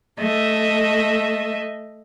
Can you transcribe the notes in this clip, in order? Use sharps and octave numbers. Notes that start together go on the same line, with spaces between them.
A3 D#5 E5